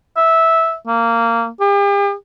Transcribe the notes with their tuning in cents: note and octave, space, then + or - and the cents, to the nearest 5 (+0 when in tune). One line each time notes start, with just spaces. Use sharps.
E5 -10
A#3 -15
G4 +45